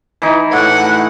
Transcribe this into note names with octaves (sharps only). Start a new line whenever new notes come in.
E3 D#4
A2 F#5